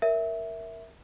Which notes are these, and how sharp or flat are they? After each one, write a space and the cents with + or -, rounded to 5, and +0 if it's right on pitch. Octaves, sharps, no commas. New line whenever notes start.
A#4 +0 C#5 +30 E5 -5